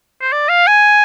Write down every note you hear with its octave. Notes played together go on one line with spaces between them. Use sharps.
C5
D5
F5
G#5